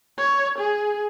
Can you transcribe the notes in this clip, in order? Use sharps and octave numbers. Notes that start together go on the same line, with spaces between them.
C#5
G#4